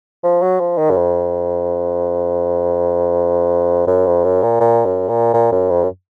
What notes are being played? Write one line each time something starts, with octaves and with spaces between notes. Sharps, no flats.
F3
F#3
F3
D#3
F#2
F2
F#2
F2
F#2
A#2
A#2
F#2
A#2
A#2
F#2
F2
F#2